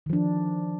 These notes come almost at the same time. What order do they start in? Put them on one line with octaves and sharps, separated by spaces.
D#3 F3 D4